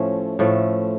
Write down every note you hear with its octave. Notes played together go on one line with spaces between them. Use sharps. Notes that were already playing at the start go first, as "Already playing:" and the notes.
Already playing: A2 F3 A3 C#4
A2 F3 A3